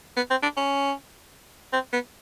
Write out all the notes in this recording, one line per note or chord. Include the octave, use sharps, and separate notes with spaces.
B3
C4
D4
C#4
C4
B3